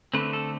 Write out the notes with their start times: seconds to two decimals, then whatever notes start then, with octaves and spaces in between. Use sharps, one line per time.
0.14 D3 A3 C4 B4
0.33 A4